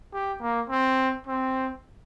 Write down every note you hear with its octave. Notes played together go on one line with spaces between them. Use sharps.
G4
A#3
C4
C4